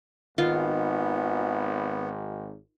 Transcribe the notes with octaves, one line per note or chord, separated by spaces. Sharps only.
G#1 D#3 B3 F4 F5